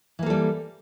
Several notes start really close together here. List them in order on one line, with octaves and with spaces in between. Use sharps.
E3 A#3 A4 G3